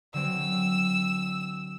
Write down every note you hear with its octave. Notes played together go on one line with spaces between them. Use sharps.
D3 F#3 C4 E6